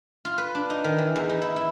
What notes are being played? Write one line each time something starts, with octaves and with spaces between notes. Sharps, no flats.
F4
B4
D4
D#4
D#3
E3
E2
D#4
E4
E4